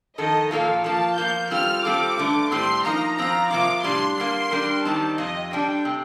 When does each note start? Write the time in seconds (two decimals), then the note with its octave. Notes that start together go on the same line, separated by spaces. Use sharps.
0.18 F2 D#3 A4 D#5
0.51 A#2 F3 A#3 F4 A4 F5
0.84 F3 A#3 F4 A5
1.18 F3 A#3 F4 G6
1.51 G3 C4 F4 A4 F6
1.85 G3 C4 F4 A4 D6
2.18 G2 D3 A3
2.51 A2 G3 C4 C6
2.84 F3 A#3 D#4 A#5
3.18 F3 C4 F4 A#5
3.51 C3 F3 A#3 F4 D6
3.84 A2 G3 D4 C6
4.17 D3 G3 A#3 C6
4.51 G3 D4 G4 A#4
4.84 D#3 G3 C4 D#4 A5
5.18 F2 C3 D#5
5.51 D3 G3 D4 G5
5.85 C3